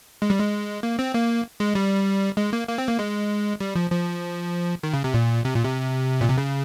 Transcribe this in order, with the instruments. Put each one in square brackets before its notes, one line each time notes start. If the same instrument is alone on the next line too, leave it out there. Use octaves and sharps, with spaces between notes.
[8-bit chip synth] G#3
G3
G#3
A#3
C4
A#3
G#3
G3
G#3
A#3
A#3
C4
A#3
G#3
G3
F3
F3
D#3
C#3
C3
A#2
C3
A#2
C3
A#2
C3
C#3